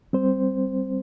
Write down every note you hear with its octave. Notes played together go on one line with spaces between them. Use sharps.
G3 C4 C5